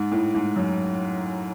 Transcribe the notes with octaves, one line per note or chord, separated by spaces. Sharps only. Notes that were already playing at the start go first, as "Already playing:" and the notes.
Already playing: G#2
A2
G#2
F#2